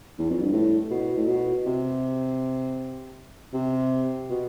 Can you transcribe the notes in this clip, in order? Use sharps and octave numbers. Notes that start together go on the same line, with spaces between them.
E2
F2
G2
A2
B2
A2
B2
C3
C3
B2